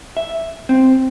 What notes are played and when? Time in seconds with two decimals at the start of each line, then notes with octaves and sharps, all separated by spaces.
0.17 E5
0.69 C4